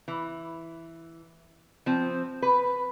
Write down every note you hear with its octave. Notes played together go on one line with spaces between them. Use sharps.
E3
F3 C4
B4